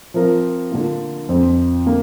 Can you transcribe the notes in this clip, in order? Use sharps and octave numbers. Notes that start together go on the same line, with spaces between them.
F3 C4 F4 A#4
D3 A#3 F4
F2 F3 C4
D3 A#3